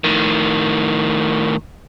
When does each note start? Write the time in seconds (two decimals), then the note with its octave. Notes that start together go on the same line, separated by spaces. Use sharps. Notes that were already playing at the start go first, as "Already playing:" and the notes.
0.04 A2 D#3